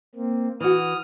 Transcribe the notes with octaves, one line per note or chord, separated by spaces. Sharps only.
A#3 C4
E3 F#4 D#6 F6